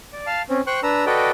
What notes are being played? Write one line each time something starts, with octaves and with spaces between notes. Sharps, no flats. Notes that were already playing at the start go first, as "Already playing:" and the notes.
D5
F5 A5
C4 C#4
C5 G5 C#6 F#6
D4 B4 A#5 E6
F#4 A4 B4 D5 D#5 G5